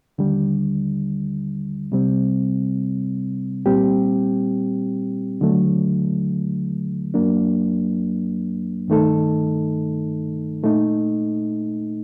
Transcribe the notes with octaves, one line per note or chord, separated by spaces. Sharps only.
D#2 D3 G3
C3 G3 C4
A#2 G3 C4 G4
D#2 D3 F#3 A3
F#2 F#3 A#3 D4
G2 D#3 A3 D#4 A4
A#2 A3 D#4